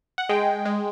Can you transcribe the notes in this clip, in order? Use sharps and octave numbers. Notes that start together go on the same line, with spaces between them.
F#5
G#3 G5
G#3